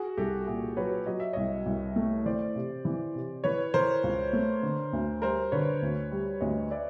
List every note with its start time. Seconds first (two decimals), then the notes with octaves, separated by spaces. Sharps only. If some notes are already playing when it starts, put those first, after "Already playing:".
Already playing: F#4 G#4
0.17 C2 G4 A4
0.47 A#2 F#4 G#4
0.77 F#3 B4 C#5
1.06 F#3 D#5
1.20 E5
1.33 C2 C#5 D#5
1.66 C2
1.96 A3
2.25 E3 C5 D5
2.55 C3
2.85 E3
3.15 C3
3.44 E3 B4 C#5
3.74 E3 A#4 C5
4.03 C#2
4.33 A3
4.63 D3
4.93 D2
5.22 G3 A#4 C5
5.52 D3 B4 C#5
5.82 D2
6.12 G3
6.41 D2 C#5 D#5
6.71 D5 E5